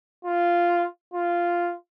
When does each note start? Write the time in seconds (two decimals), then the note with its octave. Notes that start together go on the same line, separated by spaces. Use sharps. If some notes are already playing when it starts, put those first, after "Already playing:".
0.25 F4
1.14 F4